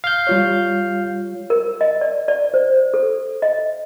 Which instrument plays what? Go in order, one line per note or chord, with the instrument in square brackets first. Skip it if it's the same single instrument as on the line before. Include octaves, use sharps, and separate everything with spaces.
[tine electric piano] F5 G6
[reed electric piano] G3 F4 C#5
[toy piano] A#4
D#5
D5
D5
C5
A4
D#5